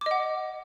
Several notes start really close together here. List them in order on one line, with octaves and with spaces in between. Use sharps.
D6 D#5 F#5